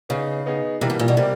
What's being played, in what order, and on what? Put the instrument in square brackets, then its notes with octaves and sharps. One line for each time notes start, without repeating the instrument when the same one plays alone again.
[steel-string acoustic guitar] C#3 [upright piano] B3 D#4 G#4
[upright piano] B3 D#4 G#4
[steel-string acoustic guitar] C3 [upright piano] E3 G3 A#3
[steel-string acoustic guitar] B2
A#2
B2
[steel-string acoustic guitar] C3 [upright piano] G3 A#3